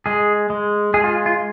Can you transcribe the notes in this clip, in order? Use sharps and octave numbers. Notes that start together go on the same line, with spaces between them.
G#3 G#4
G#3
G#3 G#4
F4
F4